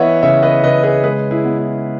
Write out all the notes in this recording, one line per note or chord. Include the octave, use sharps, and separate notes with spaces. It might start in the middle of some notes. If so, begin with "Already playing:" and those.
Already playing: E3 B3 B4 C#5 D#5 E5 F#5
C#3 C#5 E5
B4 D#5
C#3 B4 D#5
G#4 B4
G#3 G#4 B4
E4 G#4
B3
E4